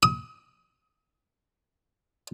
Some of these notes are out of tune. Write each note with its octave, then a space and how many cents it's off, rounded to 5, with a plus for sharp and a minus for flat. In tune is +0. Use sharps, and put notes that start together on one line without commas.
D#6 +35